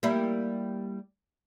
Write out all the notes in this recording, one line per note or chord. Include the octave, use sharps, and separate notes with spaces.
G3 A#3 E4